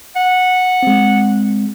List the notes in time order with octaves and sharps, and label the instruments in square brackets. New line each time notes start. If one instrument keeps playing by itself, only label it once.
[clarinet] F#5
[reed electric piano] G#3 C4